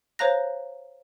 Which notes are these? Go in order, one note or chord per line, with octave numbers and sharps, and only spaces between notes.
C5 C#5 F5 A#5 F#6 A#6